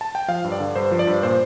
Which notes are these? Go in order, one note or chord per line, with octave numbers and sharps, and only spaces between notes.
A5
G5
F3 F5
G2
D5
D3
G2 C5
F3
D5
G2
A#2 C5